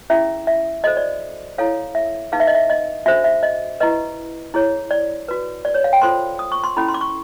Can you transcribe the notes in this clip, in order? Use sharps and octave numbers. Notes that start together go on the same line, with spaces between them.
C#4 E4 G#4 E5
E5
F#4 A4 C5 D#5
D5
E4 A4 C#5 F5
E5
D#4 G#4 B4 F5
E5
D#5
E5
D#5
D4 F#4 A4 C5 E5
E5
D#5
E4 G4 B4 D#5
E4 G#4 C#5
D5
F#4 B4
D5
C#5
F5
G5
F4 A4 C5 C6
D#6
C#6
C6
C#4 E4 A4 B5
C6
D6
C#6